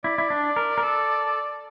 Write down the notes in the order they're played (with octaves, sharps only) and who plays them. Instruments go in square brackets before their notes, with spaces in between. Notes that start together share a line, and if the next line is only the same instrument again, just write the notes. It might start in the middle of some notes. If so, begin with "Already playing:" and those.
[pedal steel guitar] E4 [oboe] D5
[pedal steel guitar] E4
D4
A#4
A#4
A4